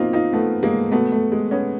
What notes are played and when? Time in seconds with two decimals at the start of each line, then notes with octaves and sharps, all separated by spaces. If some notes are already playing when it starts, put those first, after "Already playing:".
Already playing: B2 F#3 A#3 C4 D#4 F4
0.13 D#4 F4
0.33 A3 B3
0.63 G#3 A#3
0.92 B2 F#3 A3 B3
1.12 A3
1.32 G#3
1.51 B3 C#4